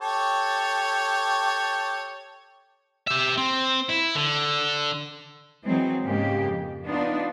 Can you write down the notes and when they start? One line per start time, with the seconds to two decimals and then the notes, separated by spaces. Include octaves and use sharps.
0.01 G4 A4 C#5
3.07 G4 E5
3.38 C4
3.89 E4
4.15 D3
5.62 E3 F#3 G#3 C4
6.03 G#2 C#3 G#3 A#3 G4
6.45 F2
6.84 B3 D4 D#4 F4